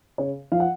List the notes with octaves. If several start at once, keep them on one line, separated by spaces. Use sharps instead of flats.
C#3 C#5
F3 F5
F#5